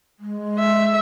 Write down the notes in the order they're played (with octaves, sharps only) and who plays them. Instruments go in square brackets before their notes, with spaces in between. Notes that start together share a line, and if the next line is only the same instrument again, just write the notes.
[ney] G#3
[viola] E5